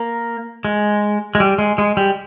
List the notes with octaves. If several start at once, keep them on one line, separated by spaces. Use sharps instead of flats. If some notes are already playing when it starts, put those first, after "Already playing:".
Already playing: A#3
G#3
G#3
G3
G#3
G#3
G3